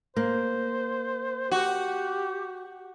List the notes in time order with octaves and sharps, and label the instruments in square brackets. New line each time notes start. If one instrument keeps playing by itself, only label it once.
[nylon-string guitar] A#3 [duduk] C5
[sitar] F#4 [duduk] G4